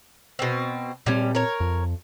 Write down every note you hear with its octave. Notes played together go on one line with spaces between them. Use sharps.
B2 C4
A#2 G3 C4 C#4
A#4 C#5
F2